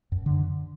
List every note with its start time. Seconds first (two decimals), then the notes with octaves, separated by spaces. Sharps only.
0.12 F#2
0.26 D3